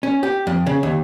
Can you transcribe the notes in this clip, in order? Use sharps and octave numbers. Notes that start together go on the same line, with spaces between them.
C#4
G4
F2
C#3
D#2